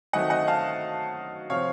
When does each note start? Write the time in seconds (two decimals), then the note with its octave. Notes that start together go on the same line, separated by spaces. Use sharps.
0.13 D#3 F#3 A3 C4 D#5 F#5
0.30 D#5 F#5
0.48 F5 A5
1.50 C3 F3 C4 C#5 F5